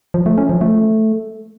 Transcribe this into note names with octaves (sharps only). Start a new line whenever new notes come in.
F3
A3
C#4
F3
A3